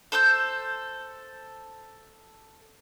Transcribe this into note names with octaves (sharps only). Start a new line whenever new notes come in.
A4 C5 E6 G6